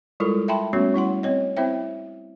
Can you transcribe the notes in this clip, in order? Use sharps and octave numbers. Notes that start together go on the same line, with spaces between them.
G3 G#3 E4 F4 A4 A#4
E5 G5 A5 B5 C6
G3 A3 B3 C#4 F#4 C#5
G3 E4 F#5 C6
C4 C#5 D#5
C4 E4 C5 E5 G5